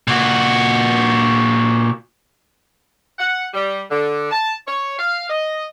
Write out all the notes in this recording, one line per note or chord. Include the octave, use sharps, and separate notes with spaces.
A#2 F#4
F#5
G3
D3
A5
C#5
F5
D#5